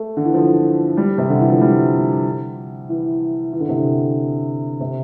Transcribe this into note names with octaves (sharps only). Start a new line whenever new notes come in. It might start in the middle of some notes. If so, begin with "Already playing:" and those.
Already playing: A3
D3
E3
F3
G3
C3
D3
E3
F3
G3
E3
E3
D3
C3
D3
C3